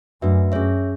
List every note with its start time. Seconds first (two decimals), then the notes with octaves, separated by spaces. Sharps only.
0.22 F#2 A3 D4 F#4 B4 E5
0.52 F#2 C#4 G#4 C#5 E5